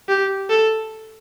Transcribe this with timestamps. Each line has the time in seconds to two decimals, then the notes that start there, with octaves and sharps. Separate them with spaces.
0.09 G4
0.50 A4